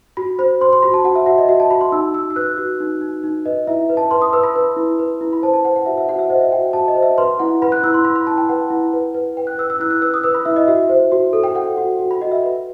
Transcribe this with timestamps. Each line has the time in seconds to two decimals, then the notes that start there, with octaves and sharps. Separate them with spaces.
0.17 F#4 B5
0.39 C5 B5
0.61 C5 C6
0.73 C6
0.83 F#4 B5
0.94 A5
1.05 F#4 F#5
1.15 E5
1.26 F#4 E5
1.38 D#5
1.49 F#4 E5
1.60 A5
1.70 F#4 B5
1.81 C6
1.92 D#4 E6
2.14 D#4 E6
2.30 E6
2.36 B4 F#6
2.57 F#4
2.80 D#4
3.01 D#4
3.24 D#4
3.46 B4 D#5
3.67 E4 E5
3.90 B4
3.97 A5
4.11 B4 C6
4.22 D#6
4.33 B4 E6
4.44 B5
4.56 B4
4.76 E4
4.99 B4
5.21 E4
5.33 B5
5.43 C5 A5
5.54 A5
5.65 C5 F#5
5.76 F#5
5.86 F#4 E5
5.97 E5
6.09 F#4 F#5
6.19 E5
6.30 C5 D#5
6.41 E5
6.52 F#4 G5
6.73 F#4 A5
6.88 D#5
6.95 C5
7.03 E5
7.18 B4 C6
7.39 E4 F#5
7.62 B4 B5
7.72 F#6
7.83 E4 E6
7.94 C6
8.05 E4 B5
8.16 B5
8.27 E4 A5
8.38 G5
8.49 B4 F#5
8.70 E4
8.93 B4
9.14 B4
9.37 B4 G5
9.47 F#6
9.58 B4 E6
9.70 E6
9.80 E4 F#6
9.91 F#6
10.02 B4 E6
10.14 D#6
10.24 B4 E6
10.35 B5
10.45 E4 E5
10.56 D#5
10.68 F#4 E5
10.89 C5
11.12 F#4
11.33 A4
11.44 G5
11.55 A4 F#5
11.77 F#4
11.99 F#4
12.11 B5
12.21 F#4 D#5
12.31 E5
12.44 B4